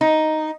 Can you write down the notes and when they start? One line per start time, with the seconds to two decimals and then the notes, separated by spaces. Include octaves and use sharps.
0.01 D#4